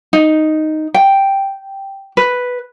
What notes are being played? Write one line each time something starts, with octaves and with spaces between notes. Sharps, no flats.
D#4
G5
B4